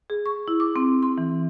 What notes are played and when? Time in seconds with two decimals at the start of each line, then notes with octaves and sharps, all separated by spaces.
0.10 G#4
0.26 C#6
0.48 E4
0.60 D6
0.76 C4
1.03 C6
1.18 E3